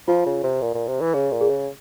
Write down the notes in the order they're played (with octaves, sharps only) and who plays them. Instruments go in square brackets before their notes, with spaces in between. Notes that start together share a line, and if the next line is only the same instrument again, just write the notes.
[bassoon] F3 [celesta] F4
[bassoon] C#3
C3
A#2
A#2
C3
E3
[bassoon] C#3 [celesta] G#4
[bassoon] A#2
[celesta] G#4
[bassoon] C#3